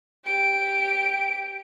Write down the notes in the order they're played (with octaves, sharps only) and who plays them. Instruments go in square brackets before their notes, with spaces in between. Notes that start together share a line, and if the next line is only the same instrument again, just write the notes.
[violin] G4 D7